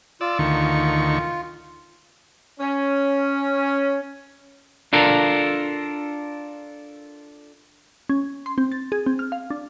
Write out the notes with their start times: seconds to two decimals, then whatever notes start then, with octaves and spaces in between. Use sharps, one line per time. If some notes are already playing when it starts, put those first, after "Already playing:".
0.21 F4 D5 E6
0.39 D2 D#3 C#6
2.60 C#4
4.93 D4 F4 A4 A#4
8.10 C#4
8.46 C6
8.58 C4
8.72 A6
8.92 G#4
9.06 C4
9.19 F6
9.32 F5
9.50 D4